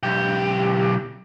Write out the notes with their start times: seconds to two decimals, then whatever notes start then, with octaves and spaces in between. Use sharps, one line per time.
0.03 B1 G4